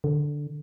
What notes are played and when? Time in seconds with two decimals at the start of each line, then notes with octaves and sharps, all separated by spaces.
0.04 D3